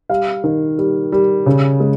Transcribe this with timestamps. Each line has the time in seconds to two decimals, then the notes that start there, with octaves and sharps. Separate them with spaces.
0.09 G3 F5
0.44 D#3
0.78 G3
1.12 G3
1.46 C#3
1.80 G#3